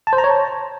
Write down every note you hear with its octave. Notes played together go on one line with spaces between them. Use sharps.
A5
C5
A#5
C#5
A5